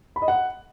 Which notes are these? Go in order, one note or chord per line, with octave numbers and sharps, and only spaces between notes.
B5
D#5
F#5